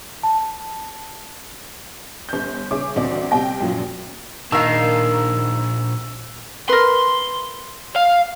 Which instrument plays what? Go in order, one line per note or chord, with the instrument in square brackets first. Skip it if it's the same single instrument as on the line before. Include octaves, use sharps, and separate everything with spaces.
[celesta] A5
[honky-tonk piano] G1 G6
C#3 G#4 C#5 E5 D6
A1 D2 C4 D5
C2 C3 G5 A#6
F#2 A#2 F3 F#3
[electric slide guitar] A#2 D4 A5 [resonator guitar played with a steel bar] D#3 F5 [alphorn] A#3 [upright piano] E6
[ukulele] A#4 B4 [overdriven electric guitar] C6
[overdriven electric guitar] F5